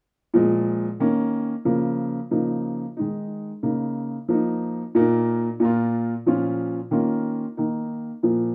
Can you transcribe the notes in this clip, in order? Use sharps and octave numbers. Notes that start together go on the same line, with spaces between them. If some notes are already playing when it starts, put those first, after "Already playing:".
A#2 F3 G#3
D#3 A#3 C#4
C#3 F3 A#3
C#3 F3 A#3 D#4
D#3 G#3 D#4
C#3 A#3 D#4
F3 A#3 D#4
A#2 A#3 D#4
A#2 A#3 F4
A#2 F3 C#4 F4
D#3 A#3 C#4 F4
D#3 A#3 D#4
A#2 F3 A#3